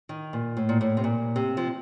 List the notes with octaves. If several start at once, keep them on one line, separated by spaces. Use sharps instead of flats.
D#3
A#2
A2
A#2
A2
C3
A#2
C3
F3